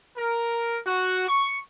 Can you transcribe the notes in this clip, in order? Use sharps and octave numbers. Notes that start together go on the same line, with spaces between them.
A#4
F#4
C#6